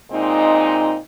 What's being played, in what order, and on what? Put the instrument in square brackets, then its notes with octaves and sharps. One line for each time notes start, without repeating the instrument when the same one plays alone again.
[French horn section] A#2 G#3 C4 D#4